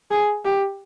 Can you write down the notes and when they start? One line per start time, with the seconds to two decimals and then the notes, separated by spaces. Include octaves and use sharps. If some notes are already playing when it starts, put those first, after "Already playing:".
0.11 G#4
0.45 G4